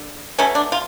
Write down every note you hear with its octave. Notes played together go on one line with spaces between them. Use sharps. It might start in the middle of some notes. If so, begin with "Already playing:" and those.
Already playing: D3
B2 F#3 A3 C#4
D4
F4